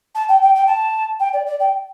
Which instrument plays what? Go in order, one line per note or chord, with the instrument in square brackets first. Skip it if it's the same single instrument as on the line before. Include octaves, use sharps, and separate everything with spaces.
[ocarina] A5
G5
G5
G5
A5
G5
D5
D5
G5